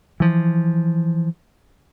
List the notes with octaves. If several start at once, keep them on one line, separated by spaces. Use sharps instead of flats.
E3 F3